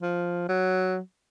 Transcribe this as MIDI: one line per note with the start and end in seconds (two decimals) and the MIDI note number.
0.02 0.48 53
0.49 0.98 54